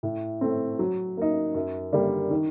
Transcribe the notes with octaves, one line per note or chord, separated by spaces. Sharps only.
A2
A3 C4
F#3
A#3 D#4
F#2
D3 G3 A#3 D4
D#3